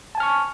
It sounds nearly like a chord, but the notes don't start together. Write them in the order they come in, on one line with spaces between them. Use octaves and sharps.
A5 G#5 F6 C#6